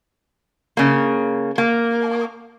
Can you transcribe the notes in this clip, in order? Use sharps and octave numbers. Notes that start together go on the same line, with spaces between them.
C#3 A#3
A#3